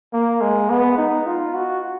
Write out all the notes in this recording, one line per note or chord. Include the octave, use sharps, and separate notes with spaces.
A#3
G#3
B3
D#4
F4
F#4